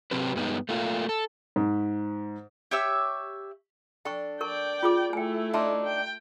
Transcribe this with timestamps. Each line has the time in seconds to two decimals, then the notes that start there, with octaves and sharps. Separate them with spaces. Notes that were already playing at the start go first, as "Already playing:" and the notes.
0.11 C3 F#3 C4 G4 B4
0.36 G2 G#3 B3 D#4
0.69 A3 A#3 F4
1.09 A4
1.56 G#2
2.71 G4 C#5 E5 E6
4.05 D4 A4 G5 C#6
4.41 A#4 D5 G5 C#6
4.83 F4 G#4 D6
5.13 A3 E4 G5 G#5
5.54 D4 D#4 E5 A5 C6
5.85 G5